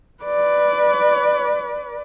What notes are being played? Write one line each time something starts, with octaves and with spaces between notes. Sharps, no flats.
B4 D5